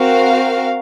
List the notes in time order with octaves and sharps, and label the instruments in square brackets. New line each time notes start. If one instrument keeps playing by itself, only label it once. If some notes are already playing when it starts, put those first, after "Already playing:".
Already playing: [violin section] C4 F#4 A#4 F5